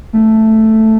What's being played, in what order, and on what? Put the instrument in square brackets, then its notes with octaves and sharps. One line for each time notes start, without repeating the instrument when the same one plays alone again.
[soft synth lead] A3